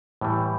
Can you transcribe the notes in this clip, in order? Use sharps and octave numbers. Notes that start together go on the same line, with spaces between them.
A2 E3 G3